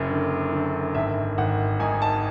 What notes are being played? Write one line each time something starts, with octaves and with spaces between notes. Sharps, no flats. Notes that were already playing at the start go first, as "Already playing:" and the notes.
Already playing: F#1 F#2
D3
D3
G#1 E5
G#1 F#5
G#2 G#5
A5